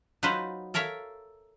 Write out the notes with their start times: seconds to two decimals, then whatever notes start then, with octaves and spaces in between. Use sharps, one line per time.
0.23 F#3 D#4 F4 B4 C5
0.74 A4 A#4 C#5 E5 F5